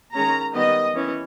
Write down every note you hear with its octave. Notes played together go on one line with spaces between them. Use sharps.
D#3 G#3 C#4 A#5
D#3 G3 B3 D#5
E3 C#4